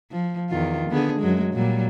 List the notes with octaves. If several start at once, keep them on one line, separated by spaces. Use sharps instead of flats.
F3
E2 D#3 F4
D3 B3 G#4
F#2 F#3 G#3
A#2 F#3 G3